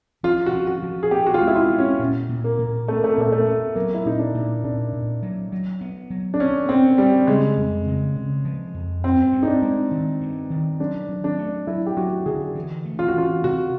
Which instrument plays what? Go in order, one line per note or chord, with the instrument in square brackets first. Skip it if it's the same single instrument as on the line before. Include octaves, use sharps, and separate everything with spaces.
[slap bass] F3 [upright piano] F4
[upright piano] F#4
[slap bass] F3
[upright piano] F#4
[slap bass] F3
[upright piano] G#4
[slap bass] B3 [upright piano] G4
[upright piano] F#4
F4
[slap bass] G#3
[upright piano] E4
F4
[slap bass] B3
[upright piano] C#4
[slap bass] A#2
A#2
[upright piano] A#3
[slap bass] A#2
[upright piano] A3 [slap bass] B3
[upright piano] A#3
A3
A#3
[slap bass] A#2 [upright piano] A3
[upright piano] A3
[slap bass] B3
[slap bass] F#3 [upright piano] A#3
[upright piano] E4
[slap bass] A#2 [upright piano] D#4
[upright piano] D4
[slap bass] A#2
[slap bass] A#2 [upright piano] D4
[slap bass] A#2
F#3
F#3
B3
F#3
[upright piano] D4
[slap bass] B3 [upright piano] C#4
[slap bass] B3 [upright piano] C4
[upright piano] G3 [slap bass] D4
[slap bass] C#3 [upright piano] G#3
[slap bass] F2
C#3
C#3
F3
F2
[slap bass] G2 [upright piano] C4
[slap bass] G2
[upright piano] D#4
D4
[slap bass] G#3
D#3
G2
D#3
[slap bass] F#3 [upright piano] D4
[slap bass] F#3
[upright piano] D4
[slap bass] A3
[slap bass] F#3 [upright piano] E4
[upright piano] G4
[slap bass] F#3 [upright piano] F#4
[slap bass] D3 [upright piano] G#4
[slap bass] E3
A3
[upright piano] F4
F#4
[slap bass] E3 [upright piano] F4
[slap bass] C3 [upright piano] F#4